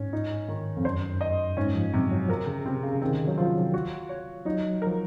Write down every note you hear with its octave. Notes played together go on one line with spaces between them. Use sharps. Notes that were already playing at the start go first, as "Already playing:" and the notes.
Already playing: G#2 C#4
D#4
D#3
F2
F#2 C5
D#5
G#2 C#4
F3
C3 F#3
F#3
F3 A#4
C#3
C3 C4
C#3
D#3 C4
F#3
F3 F4
F#4
C#5
F#3 D#4
A#4
F3